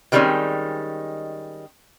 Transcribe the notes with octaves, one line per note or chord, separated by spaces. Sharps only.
B2 D#3 G3 G#3 C4 C#4